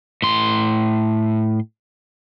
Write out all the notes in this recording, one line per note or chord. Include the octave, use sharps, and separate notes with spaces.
A2 C6